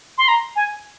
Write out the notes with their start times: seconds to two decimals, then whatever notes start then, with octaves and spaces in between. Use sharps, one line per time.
0.18 C6
0.28 A#5
0.56 G#5